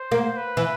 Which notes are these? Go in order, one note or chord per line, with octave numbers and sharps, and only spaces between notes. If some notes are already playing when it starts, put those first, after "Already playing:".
Already playing: C5
A#3
B4
E3